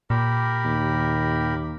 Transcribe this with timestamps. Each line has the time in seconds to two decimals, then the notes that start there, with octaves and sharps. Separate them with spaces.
0.10 A#2 G4 A#4 B5
0.65 D#2